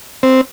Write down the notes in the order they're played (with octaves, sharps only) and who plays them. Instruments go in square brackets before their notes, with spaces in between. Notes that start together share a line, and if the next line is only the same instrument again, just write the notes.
[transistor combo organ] C4